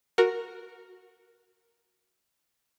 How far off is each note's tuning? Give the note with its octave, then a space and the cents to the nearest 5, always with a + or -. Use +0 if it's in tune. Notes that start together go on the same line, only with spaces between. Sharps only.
F#4 -10 A#4 +0